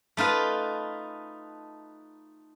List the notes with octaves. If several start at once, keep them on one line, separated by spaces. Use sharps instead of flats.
A3 D#4 F4 B4